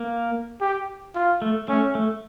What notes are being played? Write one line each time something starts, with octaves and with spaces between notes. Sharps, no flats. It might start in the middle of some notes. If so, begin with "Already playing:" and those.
Already playing: A#3
G4
F4
A3
A3 C#4
A3